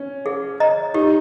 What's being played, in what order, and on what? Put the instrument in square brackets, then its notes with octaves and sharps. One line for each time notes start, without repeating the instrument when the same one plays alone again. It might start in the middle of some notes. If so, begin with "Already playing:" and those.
Already playing: [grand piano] C#4
[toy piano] G#4
D#5 A#5
[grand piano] D#4 [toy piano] G4